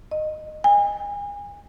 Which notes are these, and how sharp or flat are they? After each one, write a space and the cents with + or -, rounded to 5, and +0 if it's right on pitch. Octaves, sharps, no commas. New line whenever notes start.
D#5 -15
G#5 -30